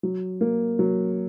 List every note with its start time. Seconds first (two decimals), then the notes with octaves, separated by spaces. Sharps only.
0.03 F#3
0.41 A#3
0.79 F#3